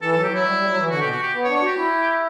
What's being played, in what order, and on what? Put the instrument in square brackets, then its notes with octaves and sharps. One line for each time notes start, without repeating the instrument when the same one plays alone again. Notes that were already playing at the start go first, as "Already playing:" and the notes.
[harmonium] E3 [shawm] A4
[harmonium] F#3 [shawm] A4
[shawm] G4
[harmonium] F#3 [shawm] E4
[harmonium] G3
G3
F#3
E3
[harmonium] D3 [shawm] F#4
[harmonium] B2 [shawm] G4
[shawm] F#4
G4
[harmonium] B3
[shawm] C#5
[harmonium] D4
[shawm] C#5
[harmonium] F#4 [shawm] G4
[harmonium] E4